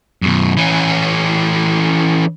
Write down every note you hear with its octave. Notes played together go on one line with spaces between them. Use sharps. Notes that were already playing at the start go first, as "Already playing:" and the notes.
F#2 B2
E3 C#4